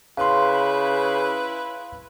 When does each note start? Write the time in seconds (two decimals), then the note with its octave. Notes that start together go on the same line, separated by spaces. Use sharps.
0.17 C#3 E4 B4 F5 C6